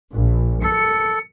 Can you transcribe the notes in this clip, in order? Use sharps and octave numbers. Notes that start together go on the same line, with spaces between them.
A#1
A4 C#7